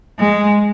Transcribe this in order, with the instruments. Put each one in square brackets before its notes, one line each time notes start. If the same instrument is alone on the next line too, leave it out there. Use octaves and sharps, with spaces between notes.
[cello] G#3